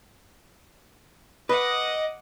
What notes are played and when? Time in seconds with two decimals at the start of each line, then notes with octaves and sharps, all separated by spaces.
1.49 B4 D#5 F#5 D6